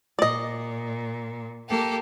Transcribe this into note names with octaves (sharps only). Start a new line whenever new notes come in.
A#2 D5 D#5
A#3 G4 A4